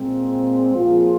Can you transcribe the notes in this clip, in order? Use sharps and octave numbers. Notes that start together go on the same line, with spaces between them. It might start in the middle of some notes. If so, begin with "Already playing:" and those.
Already playing: A#2 G#3 C4
F3 A#3 F4 G#4